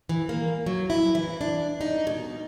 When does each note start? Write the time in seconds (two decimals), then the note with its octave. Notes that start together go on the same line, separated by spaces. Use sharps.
0.09 E3
0.29 A#3
0.66 F#3
0.90 E4
1.15 E3
1.41 D4
1.81 D#4
2.07 B2